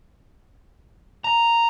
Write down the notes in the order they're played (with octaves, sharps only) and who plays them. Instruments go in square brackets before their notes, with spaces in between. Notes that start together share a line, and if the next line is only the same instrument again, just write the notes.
[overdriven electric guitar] A#5